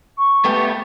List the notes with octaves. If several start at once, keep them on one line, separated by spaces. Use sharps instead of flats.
C#6
A3 B3 G4